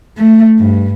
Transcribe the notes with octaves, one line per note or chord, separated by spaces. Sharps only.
A3
G2